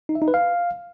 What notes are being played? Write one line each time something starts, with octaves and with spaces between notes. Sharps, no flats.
D#4
E5
D#4
B4
F5